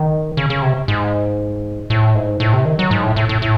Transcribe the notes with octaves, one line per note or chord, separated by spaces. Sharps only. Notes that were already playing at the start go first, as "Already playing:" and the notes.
Already playing: D#3
C#3
C#3
C3
G#2
A2
G#2
A2
C3
D#3
F#3
G#2
A2
A2
A2
A2